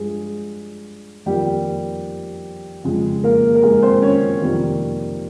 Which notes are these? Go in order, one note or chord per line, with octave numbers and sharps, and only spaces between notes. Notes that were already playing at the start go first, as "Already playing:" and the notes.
Already playing: G2 F3 G#3 G#4
F2 D#3 G3 A#3 G4
F2 C#3 G#3
A#3 A#4
A#4
G#3 G#4
C4 C5
C#4 C#5
F2 C3 D#3 G3 A#3